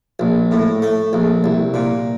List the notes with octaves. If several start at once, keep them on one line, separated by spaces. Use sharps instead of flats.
A#1
A2
A3
A#1
C2
A#2